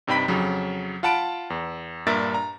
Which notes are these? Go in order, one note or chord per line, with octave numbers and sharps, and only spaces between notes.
G2 C3 D#4 G5 B5 B6
F2 C#3 F#3
F4 F#5 A5 B5 D7
E2
G2 A#2 A#4 E5 A6
A#5